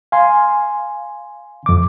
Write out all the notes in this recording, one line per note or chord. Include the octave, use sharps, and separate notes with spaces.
F5 G#5 C6
F2 D6